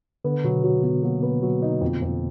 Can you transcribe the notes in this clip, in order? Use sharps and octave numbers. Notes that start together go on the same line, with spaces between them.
D3 B3
B2 F#3
F#3
F#3 B3
F#3 A#3
B3
F#3
D#4
F2
F2